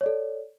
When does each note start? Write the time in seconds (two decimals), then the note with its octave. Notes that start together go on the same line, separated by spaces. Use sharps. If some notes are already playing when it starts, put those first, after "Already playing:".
0.01 C#5
0.03 D5
0.06 A4